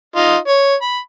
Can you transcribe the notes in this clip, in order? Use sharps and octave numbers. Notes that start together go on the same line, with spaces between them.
D#4 F4
C#5
B5